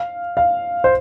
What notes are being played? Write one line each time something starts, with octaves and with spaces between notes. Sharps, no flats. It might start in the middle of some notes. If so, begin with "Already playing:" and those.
Already playing: F5
F5
C5